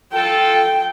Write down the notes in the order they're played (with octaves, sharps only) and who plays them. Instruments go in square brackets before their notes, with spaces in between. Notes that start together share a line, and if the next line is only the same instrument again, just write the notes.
[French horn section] F4 A4 [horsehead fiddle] G5